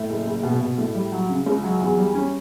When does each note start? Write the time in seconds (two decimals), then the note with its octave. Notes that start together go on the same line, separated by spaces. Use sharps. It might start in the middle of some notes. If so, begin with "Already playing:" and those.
Already playing: A2
0.09 F#1
0.26 F#1
0.43 B2
0.61 B2
0.78 A2
0.95 G3
1.12 F#3
1.29 C#3
1.46 C#2
1.63 F#3
1.80 E2
1.98 G3
2.15 C#4